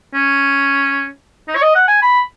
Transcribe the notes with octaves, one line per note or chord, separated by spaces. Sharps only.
C#4
D#4
C#5
D#5
F#5
G#5
B5